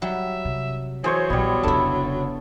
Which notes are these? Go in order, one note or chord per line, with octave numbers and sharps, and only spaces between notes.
F#3 G3 E5
C3
E3 F#3 G#4 C5 C#5
A#1 G3 B3
F1 C#3 D4 E4 A4